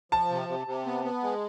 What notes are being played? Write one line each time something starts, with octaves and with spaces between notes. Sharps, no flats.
F3 A5
C3
C3
C3
B3
B3
G#3